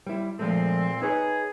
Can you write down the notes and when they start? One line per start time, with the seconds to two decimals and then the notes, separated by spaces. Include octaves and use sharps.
0.06 G3 E4
0.39 A#2 F3 G#3 A3 C4
1.02 D#4 G#4 B4 C#5